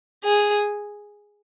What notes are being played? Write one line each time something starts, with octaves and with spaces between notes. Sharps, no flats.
G#4